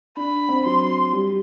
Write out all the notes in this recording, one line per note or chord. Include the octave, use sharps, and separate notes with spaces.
D4 B5
C4
F#3 C6
G3